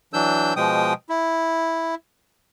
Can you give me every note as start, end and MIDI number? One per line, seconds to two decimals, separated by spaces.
0.13 0.54 52
0.13 0.54 54
0.13 0.54 62
0.13 0.54 88
0.13 0.54 91
0.56 0.93 47
0.56 0.93 53
0.56 0.93 56
0.56 0.93 79
0.56 0.93 87
1.09 1.95 64